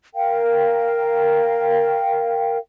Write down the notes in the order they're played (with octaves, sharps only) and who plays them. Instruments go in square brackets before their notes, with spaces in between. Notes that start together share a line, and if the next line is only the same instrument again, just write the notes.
[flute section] A#4 F5 G5